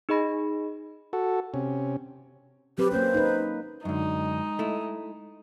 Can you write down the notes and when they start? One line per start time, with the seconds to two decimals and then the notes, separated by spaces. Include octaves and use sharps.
0.09 D#4 G#4 D#5 B5 A#6
1.13 F#4 A4
1.54 C3 C#4
2.78 F#3 C4 G4 B4
2.92 A#3 C#4 C5
3.14 D#4 B4
3.85 F#2 D3 G#3 D#4
4.59 A3 E4